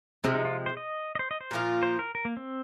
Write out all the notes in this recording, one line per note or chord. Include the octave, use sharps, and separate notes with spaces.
C3 F3 G#3 C4
D#4
F4
C5
D#5
D#5
C5
D#5
C5
A#2 F3 A#3 F4
C5
A#4
A#4
A#3
C4